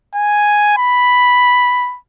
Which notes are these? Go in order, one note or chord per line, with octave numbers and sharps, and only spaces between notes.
G#5
B5